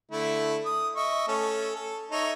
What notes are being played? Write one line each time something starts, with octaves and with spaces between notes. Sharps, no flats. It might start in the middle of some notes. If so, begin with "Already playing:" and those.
D3 A3 E4
D#6
D#5 E5 C#6
A3 C#4 A4
A4
D#4 C#5 E5